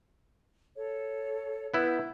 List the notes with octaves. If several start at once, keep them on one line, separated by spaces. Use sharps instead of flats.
A4 C#5
B3 E4 B4 G6